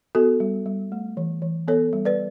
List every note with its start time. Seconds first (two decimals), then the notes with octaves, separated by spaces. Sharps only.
0.15 B3 F#4 A4
0.40 G3
0.66 G3
0.92 A3
1.17 E3
1.42 E3
1.68 B3 A4 C#5
1.93 G3
2.05 B4 D5